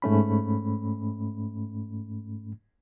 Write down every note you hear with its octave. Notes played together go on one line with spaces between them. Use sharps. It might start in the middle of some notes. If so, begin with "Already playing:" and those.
G#2 A3 C#4 B5